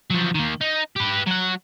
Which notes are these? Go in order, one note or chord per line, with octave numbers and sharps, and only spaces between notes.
F3 F#3
D#3 A#3
D#4
G4 B4
F#3 F#5